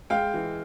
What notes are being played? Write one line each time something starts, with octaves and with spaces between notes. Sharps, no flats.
G#3 F5 G5
E3